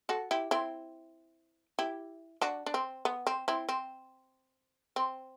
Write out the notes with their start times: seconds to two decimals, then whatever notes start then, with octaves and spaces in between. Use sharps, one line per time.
0.09 F#4 A4
0.31 E4 G4
0.51 C4 E4
1.79 E4 G4
2.41 D4 F#4
2.66 D4
2.74 C4
3.05 B3
3.27 C4
3.48 C4 E4
3.69 C4
4.96 C4